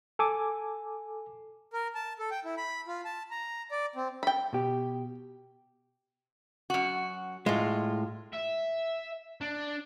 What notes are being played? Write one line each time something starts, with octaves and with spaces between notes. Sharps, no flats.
A4 G#5 D6
A#4
A5
A4
G5
E4
B5
F4
A5
A#5
D5
C4
G5 B5
B2 G4
F#2 F#4
A2 G#3 F4
E5
D4